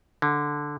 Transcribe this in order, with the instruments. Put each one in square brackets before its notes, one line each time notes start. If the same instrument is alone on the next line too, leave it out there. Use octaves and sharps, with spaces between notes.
[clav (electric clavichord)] D3